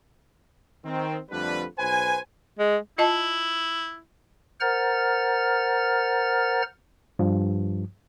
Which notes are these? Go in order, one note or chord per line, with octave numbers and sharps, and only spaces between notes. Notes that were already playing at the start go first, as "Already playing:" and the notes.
D#3 C4
F2 D3 G3 A3 D4 B4
B1 B4 C5 G#5
G#3
E4 F4 D#5 A5
A#4 C5 F#5 A#5 F6 A6
G2 F3